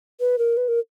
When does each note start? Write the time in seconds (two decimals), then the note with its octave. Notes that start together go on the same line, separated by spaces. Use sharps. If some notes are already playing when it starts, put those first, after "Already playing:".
0.20 B4
0.38 A#4
0.57 B4
0.68 A#4